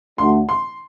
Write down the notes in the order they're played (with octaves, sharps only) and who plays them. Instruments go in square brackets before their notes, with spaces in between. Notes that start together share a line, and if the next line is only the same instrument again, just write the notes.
[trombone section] D2 D3 A3 D4 F#4 [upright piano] C6
[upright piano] C6